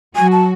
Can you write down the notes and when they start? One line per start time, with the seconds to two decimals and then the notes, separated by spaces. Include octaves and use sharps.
0.16 F#3 F#4 G#5
0.32 A5